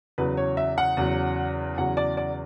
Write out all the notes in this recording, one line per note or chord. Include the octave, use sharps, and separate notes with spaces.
E2 C#3 F#3 B4
C#5
E5
F#5
E2 C#3 F#3
E2 C#3 F#3 F#5
D5
D5